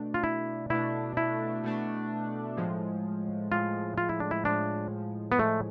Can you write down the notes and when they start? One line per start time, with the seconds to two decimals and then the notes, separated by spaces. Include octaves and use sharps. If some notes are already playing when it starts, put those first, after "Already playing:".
Already playing: B2 A3 D4
0.14 F4
0.24 E4
0.70 B2 A3 D4 E4
1.17 E4
1.64 B2 A3 D4
2.57 A2 F3 G#3
3.51 A2 F3 G#3 F4
3.98 F4
4.09 E4
4.20 D4
4.31 E4
4.45 A2 F3 G#3 D4
5.32 B3
5.38 A2 F3 G#3 A3